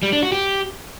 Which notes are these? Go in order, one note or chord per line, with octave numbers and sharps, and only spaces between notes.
G3
D4
F#4
G4